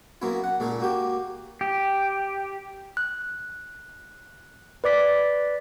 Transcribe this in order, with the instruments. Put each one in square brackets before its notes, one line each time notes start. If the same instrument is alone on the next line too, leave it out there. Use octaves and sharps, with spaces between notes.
[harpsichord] F#3 A#3 B3 C#4 E4
F#5
A#2 G#3 C#4 D#4 A4
A#3 F#4 G4
[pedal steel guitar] G4
[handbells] F#6
B4 D5 D6 B6